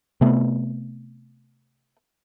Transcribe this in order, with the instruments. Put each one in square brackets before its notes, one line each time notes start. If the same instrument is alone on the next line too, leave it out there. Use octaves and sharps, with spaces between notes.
[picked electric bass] C3 A3 B3